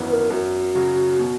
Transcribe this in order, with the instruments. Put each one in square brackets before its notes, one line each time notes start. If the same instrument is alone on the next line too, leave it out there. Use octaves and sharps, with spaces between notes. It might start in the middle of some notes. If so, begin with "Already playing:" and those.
Already playing: [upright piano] G#1 F#2 E3 B3
[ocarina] B4
A#4
[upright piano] F#2 [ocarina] F#4
[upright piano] C#3 F#3
B2